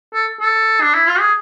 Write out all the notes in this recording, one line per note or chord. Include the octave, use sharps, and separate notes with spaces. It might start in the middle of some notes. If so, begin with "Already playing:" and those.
A4
A4
D4
E4
F4
G#4